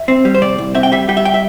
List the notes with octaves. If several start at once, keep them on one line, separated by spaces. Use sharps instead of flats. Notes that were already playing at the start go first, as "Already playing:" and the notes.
Already playing: E5
C4
G3
C5
C3 D5
C2
C4 E5
G5
G3 E5
G3 G5
E5
G5
E5